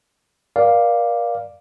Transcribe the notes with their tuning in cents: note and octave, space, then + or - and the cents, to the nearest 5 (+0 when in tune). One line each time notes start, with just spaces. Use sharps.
A#4 +35 D5 +0 F5 +0